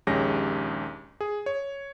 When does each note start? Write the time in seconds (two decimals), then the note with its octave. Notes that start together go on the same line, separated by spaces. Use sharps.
0.07 A#1 D#2 G#3 C#4 G4 A#6
1.21 G#4
1.46 C#5